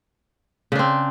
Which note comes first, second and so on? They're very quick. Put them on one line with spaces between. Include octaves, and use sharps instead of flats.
C#3 D4 C4